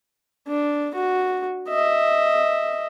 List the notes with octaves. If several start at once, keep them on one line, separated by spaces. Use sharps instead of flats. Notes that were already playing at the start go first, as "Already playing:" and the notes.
D4
F#4
D#5 E5